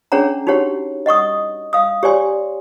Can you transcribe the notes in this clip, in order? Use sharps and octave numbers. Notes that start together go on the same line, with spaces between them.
C#4 D4 G#4 C#5 F#5 A#5
D#4 F#4 G4 C#5 F#5
D#5 F#5 C#6 D#6
F5 D#6
G4 C#5 D5 G#5 C6